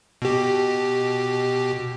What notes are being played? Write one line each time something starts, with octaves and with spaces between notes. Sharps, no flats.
B2 G4